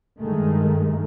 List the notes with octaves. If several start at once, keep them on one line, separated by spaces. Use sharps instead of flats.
G2 D#3 G#3 A3